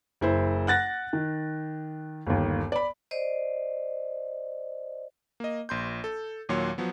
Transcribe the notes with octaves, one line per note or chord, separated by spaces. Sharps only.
F#1 E4 C5
F#5 F#6 A6 A#6
D#3
G1 D#2
D5 B5
C5 D5 D#5
A#3 D#5
A#1 C6 G6
A4
D#2 A#2 F#3 C#5 C6
F3 F#3 B3